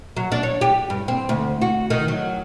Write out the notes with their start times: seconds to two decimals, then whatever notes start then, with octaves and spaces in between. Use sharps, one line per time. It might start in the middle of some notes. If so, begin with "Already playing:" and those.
0.17 F#3
0.32 D4
0.43 C#5
0.61 G4
0.90 G2
1.08 C4
1.29 D2
1.61 F#4
1.90 D#3
2.08 F#3